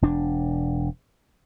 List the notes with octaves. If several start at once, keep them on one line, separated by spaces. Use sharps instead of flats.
E1 D4